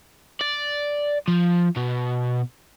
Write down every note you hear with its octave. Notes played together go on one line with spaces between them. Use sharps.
D5
F3
B2